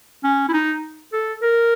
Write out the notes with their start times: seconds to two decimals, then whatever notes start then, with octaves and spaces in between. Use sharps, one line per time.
0.24 C#4
0.49 E4
0.53 D#4
1.13 A4
1.42 A#4